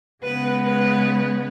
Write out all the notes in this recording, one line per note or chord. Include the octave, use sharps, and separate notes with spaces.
C#3 G#3 B3 B4
B4